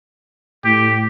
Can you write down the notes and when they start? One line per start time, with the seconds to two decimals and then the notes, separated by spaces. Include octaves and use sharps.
0.65 A2 G4